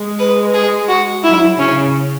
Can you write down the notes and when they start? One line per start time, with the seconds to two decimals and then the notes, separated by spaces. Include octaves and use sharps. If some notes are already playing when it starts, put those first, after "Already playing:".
Already playing: G#3
0.19 B4
0.54 G#4
0.89 F#4
1.24 F#3 E4
1.58 C#3 C#4